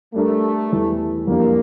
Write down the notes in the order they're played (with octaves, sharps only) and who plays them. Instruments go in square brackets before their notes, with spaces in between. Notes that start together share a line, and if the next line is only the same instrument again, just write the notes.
[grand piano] G3 D4 G4 A#4 [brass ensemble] A3
[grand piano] E2 E3 G3
[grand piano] F2 E3 G3 D4 G4 [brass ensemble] A#3